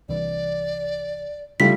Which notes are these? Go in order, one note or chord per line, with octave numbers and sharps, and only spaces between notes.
C2 E3 D5
C#3 G3 A3 E4 F4 B6